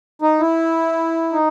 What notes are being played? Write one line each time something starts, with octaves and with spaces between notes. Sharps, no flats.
D#4
E4
D#4